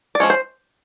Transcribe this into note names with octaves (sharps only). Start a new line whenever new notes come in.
D5
F3 G#3 C#4 C#5
C5